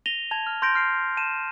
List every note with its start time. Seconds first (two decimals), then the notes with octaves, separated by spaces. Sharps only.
0.06 A#6 D#7 F7 G7
0.31 A5 G#6 F7
0.47 F6
0.62 C6 G6 A#6 D7
0.75 F6 C7 D7
1.17 A5 D#7 E7